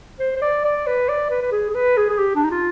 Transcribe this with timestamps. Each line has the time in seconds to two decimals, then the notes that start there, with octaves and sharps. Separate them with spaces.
0.20 C5
0.36 C5
0.42 D5
0.65 D5
0.87 B4
1.09 D5
1.30 B4
1.42 B4
1.52 G#4
1.69 G#4
1.75 B4
1.97 G#4
2.09 G#4
2.19 G4
2.35 D4
2.44 D#4
2.51 F4